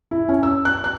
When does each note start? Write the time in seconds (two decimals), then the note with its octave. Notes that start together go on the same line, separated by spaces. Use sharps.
0.11 E4
0.28 C#4
0.43 E6
0.65 F#6
0.84 F#6